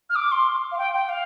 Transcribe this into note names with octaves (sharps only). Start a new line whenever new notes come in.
F6
D6
C6
F5
G5
G5
F5